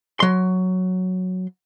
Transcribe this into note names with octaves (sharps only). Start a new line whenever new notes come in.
F#3 C6